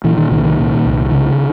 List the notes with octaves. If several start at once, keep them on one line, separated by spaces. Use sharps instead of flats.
A#2 E3
D#3
C2 D#3
D#3
A#2
C2
C#3